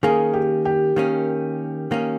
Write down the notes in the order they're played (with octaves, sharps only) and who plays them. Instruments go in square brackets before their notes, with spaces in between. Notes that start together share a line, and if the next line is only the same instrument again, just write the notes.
[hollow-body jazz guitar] D#3 A#3 C#4 [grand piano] G#4
[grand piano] G4
G4
[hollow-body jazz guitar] D#3 A#3 C#4
D#3 A#3 C#4